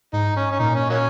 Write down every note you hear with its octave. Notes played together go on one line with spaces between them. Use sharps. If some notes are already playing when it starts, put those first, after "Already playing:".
G#2 D#4
C#4
C#4
A#2 D#4
C#4
F#3 A#3 C#4